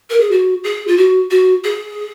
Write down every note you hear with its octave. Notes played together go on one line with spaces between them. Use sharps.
A#4
G#4
F#4
G#4
F4
F#4
F#4
G#4